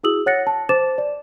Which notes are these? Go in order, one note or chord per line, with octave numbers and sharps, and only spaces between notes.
E4 F#4 G#4 D#6 E6 F#7
C#5 F#5 F#6 A6 A#6 C#7
A5
C5 A5 D6 A6 E7
D5